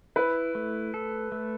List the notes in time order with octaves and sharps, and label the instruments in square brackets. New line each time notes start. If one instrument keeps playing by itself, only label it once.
[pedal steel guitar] E4 [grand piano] B4
[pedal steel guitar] A3
A4
A3